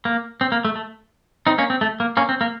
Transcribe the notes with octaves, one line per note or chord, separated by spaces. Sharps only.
A#3
C4
A#3
A3
A3
C4 D#4
A#3 C#4
C4
A3
A#3
A#3 C#4
C4
A#3